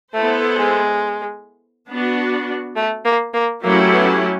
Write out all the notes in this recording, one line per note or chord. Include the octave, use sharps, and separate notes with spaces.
A3 B3 E4 A4 C5
G#3
B3 D4 F#4
A3
A#3
A#3
F#3 A3 A#3 C#4 E4 G4
B3